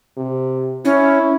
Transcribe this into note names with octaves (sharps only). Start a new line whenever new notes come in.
C3
C#4 E4